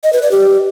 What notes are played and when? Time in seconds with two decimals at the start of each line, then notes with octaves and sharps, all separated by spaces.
0.04 D#5
0.13 B4
0.22 D5
0.31 G4